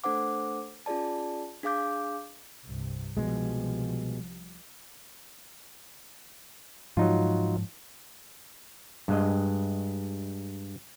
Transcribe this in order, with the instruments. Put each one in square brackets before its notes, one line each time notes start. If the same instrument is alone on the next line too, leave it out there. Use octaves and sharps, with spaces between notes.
[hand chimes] A3 D4 A4 C5 F#5 D6
C#4 F4 G#4 D5 A5
D4 G#4 F5 D6 G6
[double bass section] C2 G2 C3
[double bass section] C2 F3 G3 [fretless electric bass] B2 G#3
[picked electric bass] G#2 F3 [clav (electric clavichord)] F#3 D#4 F4
[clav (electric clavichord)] G2 G#3 D#5